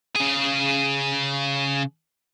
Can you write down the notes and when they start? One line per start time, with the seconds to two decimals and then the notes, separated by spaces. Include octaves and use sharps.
0.16 C#3 G#4